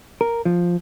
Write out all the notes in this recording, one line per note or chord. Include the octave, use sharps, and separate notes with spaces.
A#4
F3